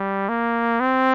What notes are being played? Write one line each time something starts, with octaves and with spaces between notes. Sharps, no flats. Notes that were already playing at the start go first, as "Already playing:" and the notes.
Already playing: G3
A#3
C4